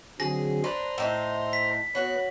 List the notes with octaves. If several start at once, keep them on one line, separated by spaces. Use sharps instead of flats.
D3 F#3 C4 G#4 A#6
D4 B4 C5 A#5 C6
A2 D#4 E5
B6
B3 F#4 B4 C#5 F#6